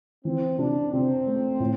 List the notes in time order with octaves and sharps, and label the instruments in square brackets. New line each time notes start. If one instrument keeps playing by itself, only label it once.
[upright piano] E3 [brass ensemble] C4
[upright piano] C3 [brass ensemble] D4
[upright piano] C3 [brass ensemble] C4
[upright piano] A3
A2